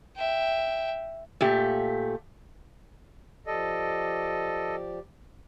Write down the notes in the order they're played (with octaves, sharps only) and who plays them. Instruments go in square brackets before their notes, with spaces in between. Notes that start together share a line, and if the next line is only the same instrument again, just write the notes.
[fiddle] E5 G5
[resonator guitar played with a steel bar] A#2 A3 G4
[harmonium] F3 G4 D5 [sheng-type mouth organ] A4 D#5